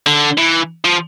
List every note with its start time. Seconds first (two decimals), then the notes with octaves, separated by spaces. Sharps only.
0.07 D3
0.38 E3
0.85 F3